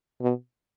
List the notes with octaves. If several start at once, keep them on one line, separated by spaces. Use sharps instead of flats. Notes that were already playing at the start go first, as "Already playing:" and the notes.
B2